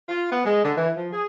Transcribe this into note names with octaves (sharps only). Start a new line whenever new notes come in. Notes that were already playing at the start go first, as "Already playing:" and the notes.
F4
B3
G#3
D3
E3
F3
G#4